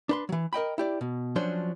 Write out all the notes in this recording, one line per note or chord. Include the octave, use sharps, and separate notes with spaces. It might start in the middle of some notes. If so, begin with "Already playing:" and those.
D4 B4 C6
E3 F#3
A#4 D#5 G5 B5
E4 G4 D5
B2
F3 F#3 C#4 D4 C5